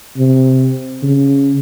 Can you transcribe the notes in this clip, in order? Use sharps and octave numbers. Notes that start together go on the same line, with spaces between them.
C3
C#3